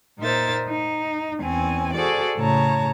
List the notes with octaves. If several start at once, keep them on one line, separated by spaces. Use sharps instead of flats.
A#2 D#4 A#4 C5 E5 A6
D#4
E2 C4 C#4 G#5
F#4 G#4 A4 C5 D5
A2 C#3 C#5 A5 A#5